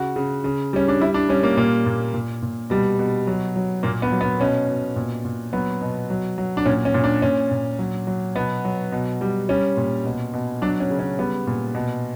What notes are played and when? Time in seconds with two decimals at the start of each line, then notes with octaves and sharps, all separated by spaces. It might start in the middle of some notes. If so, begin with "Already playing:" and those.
Already playing: C#3 F#4
0.16 C#3
0.44 C#3
0.73 G3 C#4
0.88 D4
1.00 G3 E4
1.14 D4
1.29 G3 C#4
1.43 A#3
1.57 A#2 A#3
1.86 A#2
2.14 A#2
2.42 A#2
2.70 B2 G3
2.99 B2
3.27 F#3
3.56 F#3
3.83 A#2 A#3
4.02 B3
4.12 F#3
4.21 B3
4.40 B2 C#4
4.68 B2
4.96 A#2
5.25 A#2
5.53 F#3 B3
5.82 B2
6.10 F#3
6.38 F#3
6.57 D4
6.66 A#2 C#4
6.85 C#4
6.94 A#2
7.04 D4
7.22 A#2 C#4
7.51 A#2
7.79 F#3
8.07 F#3
8.36 B2 B3
8.65 F#3
8.92 B2
9.21 G3
9.49 G3 C#4
9.77 A#2
10.05 B2
10.33 B2
10.62 F#3 D4
10.80 C#4
10.90 C#3
10.99 C#4
11.19 G3 B3
11.47 A#2
11.75 B2